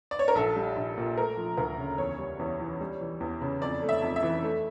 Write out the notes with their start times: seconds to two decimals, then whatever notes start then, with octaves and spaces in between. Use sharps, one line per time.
0.11 D5
0.19 C#5
0.28 A#4
0.35 A#1 A4
0.56 G3
0.76 A#1
0.98 A#2
1.17 A3 A#4
1.37 F3
1.57 D2 A#4
1.78 C#3
1.98 E2 C#5
2.19 G3
2.39 E2
2.60 E3
2.81 G3
3.01 E3
3.20 E2
3.41 C#3
3.61 F2 D5
3.82 A3
3.89 E5
4.02 F2
4.16 E5
4.22 E3
4.43 A3